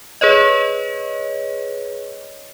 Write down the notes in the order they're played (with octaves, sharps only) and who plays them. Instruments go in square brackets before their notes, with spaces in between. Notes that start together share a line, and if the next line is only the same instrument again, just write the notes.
[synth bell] G#4 B4 C#5 D#5